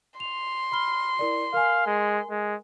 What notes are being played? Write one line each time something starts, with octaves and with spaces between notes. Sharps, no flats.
C6 F7
B5 F6 G7
E4 A#4 D5
A#4 F5 G#5
G#3
G#3